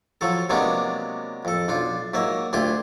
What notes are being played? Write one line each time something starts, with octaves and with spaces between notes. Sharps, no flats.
F3 F#3 A4
C3 F#3 G#3 A#3 B3 D4
F2 A4
B1 D4 F4
G#2 F#3 A#3 E5
D2 F4 G4 G#5 C6